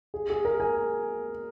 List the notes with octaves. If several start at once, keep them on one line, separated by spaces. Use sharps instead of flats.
G#4
G#4
A#4
G#5